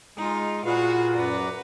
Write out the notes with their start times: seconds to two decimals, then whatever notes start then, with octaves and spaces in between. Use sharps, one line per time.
0.18 G#3 D#4 F4
0.65 A#2 F4 F#4 G#4 B4 F5
1.14 F#2 F#4 B4 D5 A#5